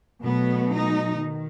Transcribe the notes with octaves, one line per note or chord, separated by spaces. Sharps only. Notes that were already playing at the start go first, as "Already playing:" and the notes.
B2 F#3 A3 B3
D#4
D#3